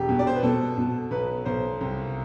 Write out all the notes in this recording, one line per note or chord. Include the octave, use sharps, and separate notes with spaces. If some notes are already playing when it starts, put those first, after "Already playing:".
Already playing: E1 G4
B2
D5
C5
B4
B2 A4
B2
B1 B4
B1 C5
C2